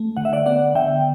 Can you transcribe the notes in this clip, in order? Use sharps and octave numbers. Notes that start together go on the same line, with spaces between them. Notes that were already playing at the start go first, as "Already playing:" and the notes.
Already playing: A3
D3 F#5
E5
D5 F#5
B3 D5 F#5
D3 E5 G5